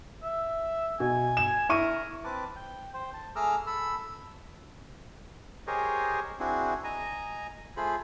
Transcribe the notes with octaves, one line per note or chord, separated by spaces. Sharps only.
E5
B2 G#5
E7
E4 A#4 C#6 D#7
C4 B4 A5 D6
G5
C5 G5
A5
A3 G#4 A#5 D6 E6 F6
A4 B5 E6
G4 G#4 A#4 C5 C#5 D#5
C4 D4 E4 F#4 G#4
D#5 G#5 A#5
A3 F4 G#4 C5 B5